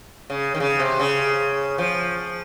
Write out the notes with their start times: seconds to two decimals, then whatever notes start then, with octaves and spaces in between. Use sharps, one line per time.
0.30 C#3
0.55 D#3
0.60 C#3
0.79 C3
1.00 C#3
1.78 F3